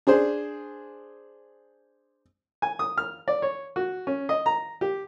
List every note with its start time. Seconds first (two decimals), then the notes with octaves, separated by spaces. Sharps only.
0.07 D4 G#4 C5
2.62 G#5
2.79 D#6
2.98 F6
3.28 D5
3.42 C#5
3.76 F#4
4.07 C#4
4.29 D#5
4.46 A#5
4.81 G4